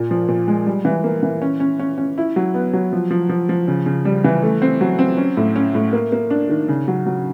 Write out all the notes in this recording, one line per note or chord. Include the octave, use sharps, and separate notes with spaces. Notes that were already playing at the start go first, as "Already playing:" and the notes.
Already playing: A#2
F3
A#2
G#3
G3
E3
A#3
E3
C#4
C#4
C#4
C#4
E4
F#3
B3
F#3
F3
F3
F3
F3
C#3
C#3
G3
E3
A3
C4
F#3
C4
C#4
A2
C#4
A2
A#3
A#3
D4
D#3
C#3
F#3
F#3